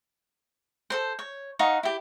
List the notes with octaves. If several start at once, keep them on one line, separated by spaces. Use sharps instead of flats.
A4 A#4 C5
C#5
D#4 F5 F#5 C#6
E4 G4